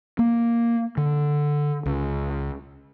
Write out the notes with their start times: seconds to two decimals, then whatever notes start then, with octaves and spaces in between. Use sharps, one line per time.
0.19 A#3
0.97 D3
1.86 C#2